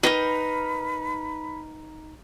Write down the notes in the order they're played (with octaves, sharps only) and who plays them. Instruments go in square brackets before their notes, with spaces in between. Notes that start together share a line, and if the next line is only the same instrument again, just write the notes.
[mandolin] D#4 A#4 [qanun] B4 G5 [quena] B5